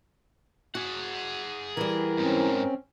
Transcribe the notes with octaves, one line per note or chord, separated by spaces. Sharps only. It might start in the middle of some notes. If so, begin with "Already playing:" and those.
F#4 G#4 F#5
E3 G3 A#4
E2 G#2 C4 C#4